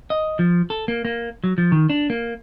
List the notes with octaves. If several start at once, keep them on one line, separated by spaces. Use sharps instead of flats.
D#5
F3
A4
A#3
A#3
F#3
F3
D#3
D4
A#3